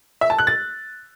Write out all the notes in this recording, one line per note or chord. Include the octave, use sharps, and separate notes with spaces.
E5
A5
F#6
A6